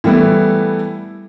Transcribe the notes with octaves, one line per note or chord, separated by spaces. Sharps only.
E3 G3 A3 B3 E4